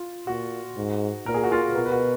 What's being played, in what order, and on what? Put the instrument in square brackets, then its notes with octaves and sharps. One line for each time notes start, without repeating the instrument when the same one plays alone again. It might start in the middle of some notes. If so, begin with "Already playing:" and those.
Already playing: [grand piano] F4
[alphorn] A#2 [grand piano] F#4
[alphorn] G#2
[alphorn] A#2 [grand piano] A#4
[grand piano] G#4
F#4
F4 G#4
B4
[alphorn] B2 [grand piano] F#4 A#4
[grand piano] B4
F#4 A#4